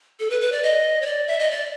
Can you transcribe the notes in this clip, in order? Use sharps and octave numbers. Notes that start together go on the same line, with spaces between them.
A4
B4
B4
D5
D#5
C#5
D5
E5
D#5
D5